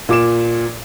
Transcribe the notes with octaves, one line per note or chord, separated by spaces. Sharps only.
A#2 D6 E7